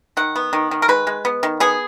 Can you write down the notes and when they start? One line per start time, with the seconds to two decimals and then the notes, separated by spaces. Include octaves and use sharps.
0.17 D#3 F#5
0.36 B3
0.53 D#3
0.71 D#3
0.82 A#4
0.88 G#3 B4
1.07 G#3
1.25 B3
1.43 D#3
1.60 B3 G#4